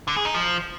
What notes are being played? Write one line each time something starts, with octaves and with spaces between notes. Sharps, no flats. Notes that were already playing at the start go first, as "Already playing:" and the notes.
D3
G#4
D#4
F3